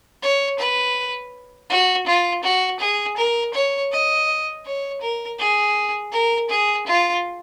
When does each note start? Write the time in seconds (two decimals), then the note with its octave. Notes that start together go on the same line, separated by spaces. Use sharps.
0.22 C#5
0.59 B4
1.70 F#4
2.07 F4
2.43 F#4
2.80 G#4
3.17 A#4
3.54 C#5
3.92 D#5
4.65 C#5
5.01 A#4
5.39 G#4
6.12 A#4
6.49 G#4
6.87 F4